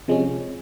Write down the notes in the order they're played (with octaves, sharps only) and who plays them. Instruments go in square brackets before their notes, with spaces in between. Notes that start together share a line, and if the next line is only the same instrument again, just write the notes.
[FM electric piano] C3 F3 G#3 C#4